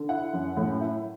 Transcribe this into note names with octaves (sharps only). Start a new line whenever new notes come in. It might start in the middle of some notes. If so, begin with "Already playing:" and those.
Already playing: D3
E4 F#5
F#2
A2
E4